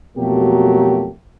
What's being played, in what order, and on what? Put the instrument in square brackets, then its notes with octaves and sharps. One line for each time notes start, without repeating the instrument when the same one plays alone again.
[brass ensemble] F2 B2 F#3 A3 A#3 G4